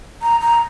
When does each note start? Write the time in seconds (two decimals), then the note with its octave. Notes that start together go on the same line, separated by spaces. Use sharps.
0.22 A#5
0.41 A#5